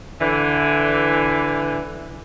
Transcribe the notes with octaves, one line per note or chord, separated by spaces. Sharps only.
D3 E3